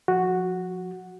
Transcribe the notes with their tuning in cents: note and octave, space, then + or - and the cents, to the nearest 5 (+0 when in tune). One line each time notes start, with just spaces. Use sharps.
F3 +25 F#4 +0